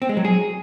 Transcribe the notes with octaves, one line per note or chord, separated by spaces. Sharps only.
C4
G#3
F#3
G#4